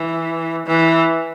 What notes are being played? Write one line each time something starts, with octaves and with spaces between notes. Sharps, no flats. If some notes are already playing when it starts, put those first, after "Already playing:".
Already playing: E3
E3